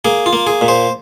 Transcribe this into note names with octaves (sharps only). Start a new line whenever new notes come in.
A#3 G#4
F4
A#3
G#4
A#2
C5